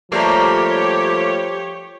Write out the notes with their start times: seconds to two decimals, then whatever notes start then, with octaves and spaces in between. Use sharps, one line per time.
0.12 F3 G3 A3 A#3 G4 C#5